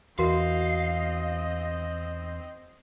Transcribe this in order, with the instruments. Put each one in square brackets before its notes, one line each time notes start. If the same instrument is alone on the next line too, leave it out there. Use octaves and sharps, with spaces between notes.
[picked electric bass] E2 [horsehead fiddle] C4 D#5 [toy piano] F#4 A#4 [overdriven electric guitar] F5